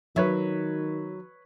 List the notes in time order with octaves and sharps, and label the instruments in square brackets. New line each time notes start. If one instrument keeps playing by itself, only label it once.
[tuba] D#3 [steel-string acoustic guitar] F#3 [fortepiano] B4 C#5 E5